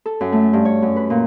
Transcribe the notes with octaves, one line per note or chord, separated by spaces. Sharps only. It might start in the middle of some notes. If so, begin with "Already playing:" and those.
A4
F#2
A3
G2
C#5
F#2
B4
A#2